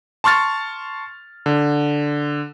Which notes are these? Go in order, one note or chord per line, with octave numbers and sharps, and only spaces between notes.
A5 C6 C#6 F6 A6
D3